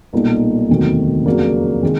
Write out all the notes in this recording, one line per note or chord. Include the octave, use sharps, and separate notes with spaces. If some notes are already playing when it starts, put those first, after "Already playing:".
B1 A#2 G3 A#3 D#4
E1 D2 C3 D#3 F#3
F2 C#3 F#3 A#3 D4
C3 D#3 G#3